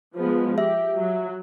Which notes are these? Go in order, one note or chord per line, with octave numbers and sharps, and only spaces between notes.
F3 G#3 B3
G4 E5
F#3